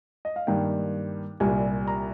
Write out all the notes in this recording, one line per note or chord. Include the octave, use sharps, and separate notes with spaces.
D#5
F5
G2 D#3 A#3 G5
C2 A#2 G3 G#5
A#5